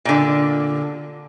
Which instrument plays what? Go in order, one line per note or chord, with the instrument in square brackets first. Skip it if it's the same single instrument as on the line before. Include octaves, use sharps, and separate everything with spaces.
[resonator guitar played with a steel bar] A#2 D3